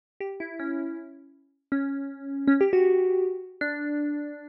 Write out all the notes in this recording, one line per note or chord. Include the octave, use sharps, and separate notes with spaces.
G4
E4
C#4
C#4
C#4
G4
F#4
D4